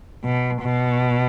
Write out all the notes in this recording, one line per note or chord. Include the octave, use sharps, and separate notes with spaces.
B2
B2